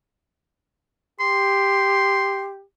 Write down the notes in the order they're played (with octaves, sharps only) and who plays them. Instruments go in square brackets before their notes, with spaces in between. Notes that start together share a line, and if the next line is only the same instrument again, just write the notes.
[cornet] G4 [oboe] C6